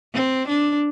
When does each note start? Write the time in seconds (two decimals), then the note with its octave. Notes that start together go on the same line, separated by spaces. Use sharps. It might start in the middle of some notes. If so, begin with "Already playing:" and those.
0.14 C4
0.48 D4